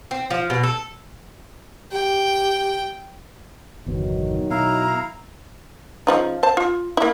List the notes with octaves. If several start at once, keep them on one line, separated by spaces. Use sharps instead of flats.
C4
F3
B2
A4
G4 G5
G1 E2 B2 D#3 F#3
B2 E4 F5 A#5
C#3 F3 D#4
C5 A5
F4
A#3 E4